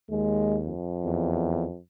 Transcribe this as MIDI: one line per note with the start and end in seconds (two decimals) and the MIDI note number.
0.10 0.70 39
0.10 0.59 56
0.66 1.79 41
1.04 1.64 40